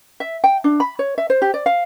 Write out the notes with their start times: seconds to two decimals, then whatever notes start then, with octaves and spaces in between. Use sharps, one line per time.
0.20 E5
0.44 G5
0.64 D4
0.80 B5
0.99 C#5
1.18 E5
1.30 C5
1.42 G4
1.54 D5
1.66 F5